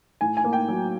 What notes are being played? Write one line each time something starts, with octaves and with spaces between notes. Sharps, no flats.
A2 G#5
G#5
A#3
G5
F#3